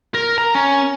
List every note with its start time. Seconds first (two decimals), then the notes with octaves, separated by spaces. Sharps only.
0.15 A#4
0.38 A#5
0.55 C#4